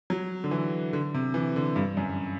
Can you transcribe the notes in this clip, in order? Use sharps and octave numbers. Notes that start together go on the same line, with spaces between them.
F#3
D3
E3
D3
C3
E3
D3
G2
F#2